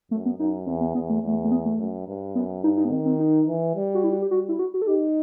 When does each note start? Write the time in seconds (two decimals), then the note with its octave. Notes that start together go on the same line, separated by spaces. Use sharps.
0.11 F#2 A3
0.25 B3
0.39 F#2 D#4
0.67 E2 C4
0.81 B3
0.95 E2 B3
1.10 A3
1.23 E2 A3
1.45 A3
1.51 B3
1.66 A3
1.79 F#2
2.08 G2
2.35 F#2 B3
2.63 G2 D#4
2.77 D#4
2.85 B3
2.91 D#3 C4
3.05 C4
3.20 D#4
3.48 E3
3.75 G3
3.95 F#4
4.04 E4
4.12 F#4
4.22 G4
4.31 G3 F#4
4.49 E4
4.59 F#4
4.74 F#4
4.82 A4
4.87 D#4 G4